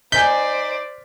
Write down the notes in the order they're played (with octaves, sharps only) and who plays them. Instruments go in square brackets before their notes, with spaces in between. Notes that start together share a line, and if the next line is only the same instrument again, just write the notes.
[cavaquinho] D#4 G#5 [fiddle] C5 D5 [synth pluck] G6 [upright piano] B6